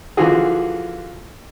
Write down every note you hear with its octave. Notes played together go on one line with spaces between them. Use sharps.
D3 E3 F3 F4 F#4 G#4